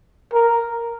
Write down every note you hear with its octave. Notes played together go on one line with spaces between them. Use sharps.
A#4